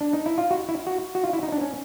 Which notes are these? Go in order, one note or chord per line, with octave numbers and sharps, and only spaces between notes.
D4
D#4
E4
F4
F#4
E4
F#4
F#4
F4
E4
D#4
D4
C#4